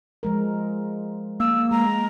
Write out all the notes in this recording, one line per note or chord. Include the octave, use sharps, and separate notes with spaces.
F3 G#3 A#4
A#3 E6
G#3 A#5